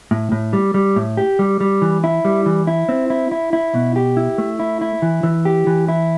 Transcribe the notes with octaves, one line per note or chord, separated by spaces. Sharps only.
A2
A2
G3
G3
A2
G4
G3
G3
E3
E4
G3
E3
E4
C4
E4
E4
E4
B2
G4
E4
A3
E4
E4
E3
E3
G4
E3
E4